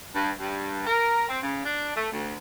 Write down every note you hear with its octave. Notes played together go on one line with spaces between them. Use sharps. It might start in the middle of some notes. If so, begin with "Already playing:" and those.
G2
G2
A#4
C4
C#3
D4
A3
D2